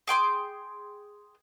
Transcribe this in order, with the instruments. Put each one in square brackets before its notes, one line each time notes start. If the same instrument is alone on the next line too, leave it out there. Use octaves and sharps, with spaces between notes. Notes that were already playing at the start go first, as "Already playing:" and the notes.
[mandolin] G#4 G5 C6 D6